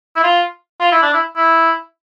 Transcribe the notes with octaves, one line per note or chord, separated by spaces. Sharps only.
E4
F4
F4
E4
D4
E4
E4